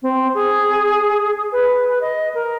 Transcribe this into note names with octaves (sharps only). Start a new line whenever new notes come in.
C4
G#4
B4
D#5
A#4